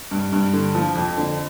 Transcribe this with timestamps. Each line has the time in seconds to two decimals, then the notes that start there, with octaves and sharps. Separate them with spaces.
0.11 G2
0.32 G2
0.53 D3
0.75 F3
0.95 F2
1.17 D3